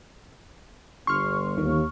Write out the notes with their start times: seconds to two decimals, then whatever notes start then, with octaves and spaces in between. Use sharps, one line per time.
1.07 G1 C6 C#6 F6
1.58 D#2 D#3